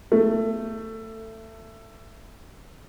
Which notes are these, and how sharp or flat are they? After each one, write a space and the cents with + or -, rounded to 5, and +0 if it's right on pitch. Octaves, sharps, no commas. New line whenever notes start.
A3 +20